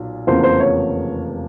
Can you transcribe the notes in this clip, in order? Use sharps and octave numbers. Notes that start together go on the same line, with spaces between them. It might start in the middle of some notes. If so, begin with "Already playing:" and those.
Already playing: B1 A#2
F1 E2 C#3 F3 A#3 C5
C5
C#5